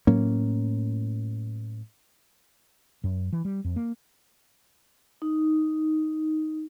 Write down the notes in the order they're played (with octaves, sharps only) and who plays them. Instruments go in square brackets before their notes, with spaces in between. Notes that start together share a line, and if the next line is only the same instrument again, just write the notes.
[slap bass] A2 F#3 A#3 C#4
[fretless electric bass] F#2
E3
G3
F2
A#3
[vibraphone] D#4